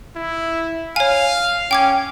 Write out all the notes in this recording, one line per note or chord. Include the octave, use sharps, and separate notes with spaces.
E4
C#5 F5 G#5
C#4 G5 D6 G#6